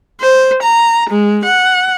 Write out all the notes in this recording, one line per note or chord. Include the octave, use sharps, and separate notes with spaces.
C5
A#5
G#3
F#5